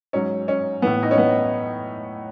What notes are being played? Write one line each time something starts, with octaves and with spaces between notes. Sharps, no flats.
G#2 F#3 C#4
C#4
A2 E3 B3
D#4
C#4
B3